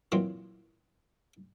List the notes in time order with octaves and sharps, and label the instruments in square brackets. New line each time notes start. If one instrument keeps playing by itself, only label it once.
[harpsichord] A#2 E3 F#3 C4